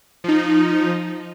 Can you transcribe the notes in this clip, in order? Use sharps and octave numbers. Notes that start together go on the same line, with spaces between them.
F3 D#4